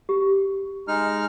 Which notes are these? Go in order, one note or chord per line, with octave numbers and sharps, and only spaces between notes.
G4
G#3 D#4 F6